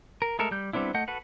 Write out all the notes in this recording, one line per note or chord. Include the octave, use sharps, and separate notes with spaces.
A#4
G#3 A3 A4 A#4 E5
G3 G6
G3 B3 C4 D4 E4
A3 D#5 F#5 G6
F#4 A4 B4 F#5